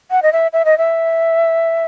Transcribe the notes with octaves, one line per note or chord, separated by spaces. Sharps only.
F#5
D#5
E5
E5
D#5
E5